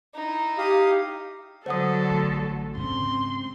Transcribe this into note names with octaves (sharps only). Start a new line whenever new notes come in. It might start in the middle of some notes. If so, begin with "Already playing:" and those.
D#4 E4
G4 F5 D#6
D3 F#3 A4 C5 F#5 D#6
A1
G#2 C#3 C4 C#4 C6